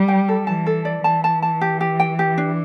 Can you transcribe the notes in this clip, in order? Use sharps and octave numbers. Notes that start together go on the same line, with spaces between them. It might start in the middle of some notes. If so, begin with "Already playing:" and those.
Already playing: G3
G5
A4
E3 A5
A4
D5
E3 A5
A5
A5
G4
G4
G5
G4
D4